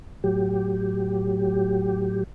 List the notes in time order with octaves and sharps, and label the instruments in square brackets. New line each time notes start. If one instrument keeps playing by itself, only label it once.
[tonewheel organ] A2 F#3 G4